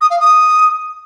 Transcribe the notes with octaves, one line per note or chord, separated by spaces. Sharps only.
D#6
F5
D#6